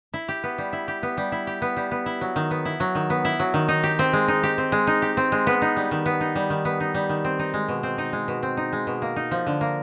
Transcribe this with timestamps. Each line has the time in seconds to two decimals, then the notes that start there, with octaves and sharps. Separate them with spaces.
0.14 E4
0.28 G4
0.43 B3
0.58 G3
0.73 E4
0.88 G4
1.03 B3
1.17 G3
1.32 E4
1.47 G4
1.62 B3
1.77 G3
1.91 B3
2.06 E4
2.21 F#3
2.36 D#3
2.51 B3
2.65 E4
2.80 F#3
2.95 D#3
3.10 B3
3.25 E4
3.40 F#3
3.54 D#3
3.68 D#4
3.83 G4
3.99 C4
4.13 G#3
4.28 D#4
4.43 G4
4.58 C4
4.72 G#3
4.87 D#4
5.02 G4
5.17 C4
5.32 G#3
5.47 B3
5.62 D#4
5.77 G3
5.91 D#3
6.06 B3
6.21 D#4
6.35 G3
6.50 D#3
6.65 B3
6.80 D#4
6.94 G3
7.09 D#3
7.25 C4
7.39 D#4
7.54 G#3
7.68 B2
7.83 C4
7.98 D#4
8.13 G#3
8.28 B2
8.43 C4
8.57 D#4
8.73 G#3
8.87 B2
9.02 A#3
9.16 D#4
9.31 F3
9.46 D3
9.61 A#3